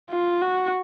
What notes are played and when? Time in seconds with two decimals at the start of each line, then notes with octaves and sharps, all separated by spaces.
0.10 F4
0.42 F#4